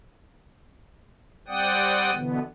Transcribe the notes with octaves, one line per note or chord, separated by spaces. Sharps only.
G3 C4 D5 F#5 G5 D#6
B2 D3 E3 B3